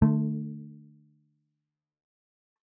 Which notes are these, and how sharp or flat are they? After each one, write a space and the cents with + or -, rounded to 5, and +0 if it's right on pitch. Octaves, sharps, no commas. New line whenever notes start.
D3 +30 A3 +0